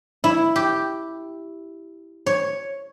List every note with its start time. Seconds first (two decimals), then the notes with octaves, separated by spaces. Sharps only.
0.24 E4
0.56 G4
2.26 C#5